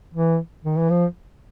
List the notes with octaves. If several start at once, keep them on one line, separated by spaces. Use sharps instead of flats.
E3
D#3
E3
F3